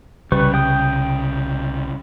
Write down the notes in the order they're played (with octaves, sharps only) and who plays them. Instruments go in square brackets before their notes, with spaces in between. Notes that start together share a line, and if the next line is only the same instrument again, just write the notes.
[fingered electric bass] C2 C#3 [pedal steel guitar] G3 B4 C#6
[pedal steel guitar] G5 D#6